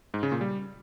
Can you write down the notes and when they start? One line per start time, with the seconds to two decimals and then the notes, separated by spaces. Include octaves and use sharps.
0.14 G#2
0.23 C#3
0.32 A#2
0.41 G3